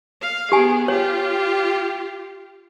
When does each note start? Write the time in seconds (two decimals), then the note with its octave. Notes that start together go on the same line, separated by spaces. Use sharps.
0.21 F5
0.52 B3 G4 G#4 G#5
0.88 F4 G4 C#5